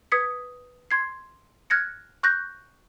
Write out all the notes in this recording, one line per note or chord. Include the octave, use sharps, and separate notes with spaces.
B4 D#6 G#6 B6 C#7
C6 G#6 C7
F6 F#6 G#6 A#6 C#7
C#6 F#6 G6 A#6